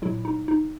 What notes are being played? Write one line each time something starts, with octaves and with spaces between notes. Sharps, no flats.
A#2 F#3 E4
D#4
D#4